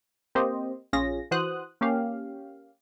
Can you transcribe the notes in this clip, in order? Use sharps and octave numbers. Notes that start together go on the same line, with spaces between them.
A#3 C4 G4 C5 D#5
A#1 C#4 F4 G#4 A#6
E3 F#4 C5 D#6 F#6
A#3 C#4 G4 F5